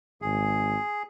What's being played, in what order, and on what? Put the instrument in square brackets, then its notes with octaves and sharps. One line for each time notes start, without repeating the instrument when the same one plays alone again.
[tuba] G#1 [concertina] G#4